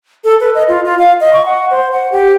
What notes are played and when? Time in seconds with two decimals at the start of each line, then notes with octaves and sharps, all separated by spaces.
0.24 A4
0.40 B4
0.55 D#5
0.68 F4
0.85 F4
0.99 F5
1.21 D#5
1.33 C#6
1.46 F#5
1.71 C5
1.92 F#5
2.12 G4